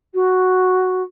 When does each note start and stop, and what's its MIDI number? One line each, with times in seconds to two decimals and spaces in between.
0.14 1.02 66